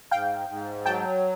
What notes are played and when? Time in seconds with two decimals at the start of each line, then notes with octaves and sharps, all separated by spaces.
0.11 G#2 F5 G5
0.49 G#2
0.86 F#3 G5 A5